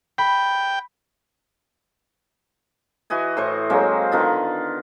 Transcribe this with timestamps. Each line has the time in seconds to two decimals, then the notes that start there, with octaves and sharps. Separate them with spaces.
0.18 G5 B5
3.10 E3 F#4 D#5 G#5
3.37 A2 C5 C#6
3.70 F#3 G#3 A#3 C4
4.12 D3 D#3 B3 F4